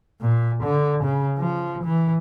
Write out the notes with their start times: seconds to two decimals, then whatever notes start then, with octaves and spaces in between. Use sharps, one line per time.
0.21 A#2
0.63 D3
1.04 C#3
1.38 F3
1.84 E3